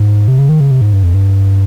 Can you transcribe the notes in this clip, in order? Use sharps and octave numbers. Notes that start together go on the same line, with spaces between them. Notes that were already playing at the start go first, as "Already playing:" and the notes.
Already playing: G#2
C3
C#3
D#3
C#3
C3
G#2
G2
F2
G2